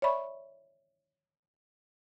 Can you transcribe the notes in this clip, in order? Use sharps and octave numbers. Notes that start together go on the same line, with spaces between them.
C#5 D5 E5 B5 C#6